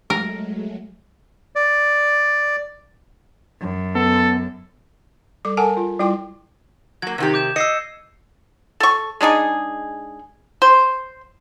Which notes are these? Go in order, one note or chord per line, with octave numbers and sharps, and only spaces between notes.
F#3 G#3 A3 A#4
D5
F#2
B3 A4
G3 A4 D6
A4 A#4 F#5 G#5 A5
F4
G3 E4 F4 G5 D6
F#3 A#3 G#6
C3 D#3 G4
D6 G6 E7
D#5 E6 C7 C#7
A4 C#6
G#3 D4 D#4 G#4
C5